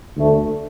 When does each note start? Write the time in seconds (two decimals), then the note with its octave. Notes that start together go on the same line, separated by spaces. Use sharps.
0.15 D2 D3 A3